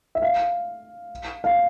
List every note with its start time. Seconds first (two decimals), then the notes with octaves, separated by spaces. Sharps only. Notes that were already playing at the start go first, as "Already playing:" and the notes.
0.15 E5
0.22 F5
1.44 F5